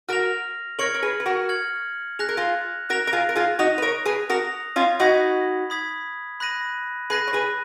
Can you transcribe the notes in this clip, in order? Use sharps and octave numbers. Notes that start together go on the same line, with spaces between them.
F#4 A#4 F6 A#6 F7
A#4 C#5 F6 G#6 C#7 F#7
A#4
G#4 B4
B4
F#4 A#4
F6 G#6 C#7 F#7
G#4 F#6 A#6 F7
A#4
F4 G#4
F#4 A#4 F#6 A#6 F7
A#4
F4 G#4
A#4
F4 G#4
D#4 F#4 D#6 A#6 F7
B4
A#4 C#5
G#4 B4
F#4 A#4 D#6 A#6 F7
C#4 F4
D#4 F#4 B5 D#6 G#6 B6
B5 D#6 G#6 B6
B5 F#6 A#6 D#7
G#4 B4 B5 F#6 A#6 D#7
C#5
G#4 B4